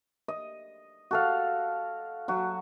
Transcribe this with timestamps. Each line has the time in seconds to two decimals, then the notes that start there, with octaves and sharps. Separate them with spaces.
0.28 D#5
1.11 F#4 A4 F5
2.28 F#3 F#4